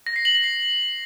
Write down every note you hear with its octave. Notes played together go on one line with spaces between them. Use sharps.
A#6
C7
F#7
A#6
C7